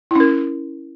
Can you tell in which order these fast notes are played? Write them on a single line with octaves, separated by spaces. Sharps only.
E4 C#4 A#4